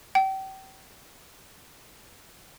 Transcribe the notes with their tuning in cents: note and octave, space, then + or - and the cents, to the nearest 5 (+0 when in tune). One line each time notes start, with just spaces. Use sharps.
G5 -35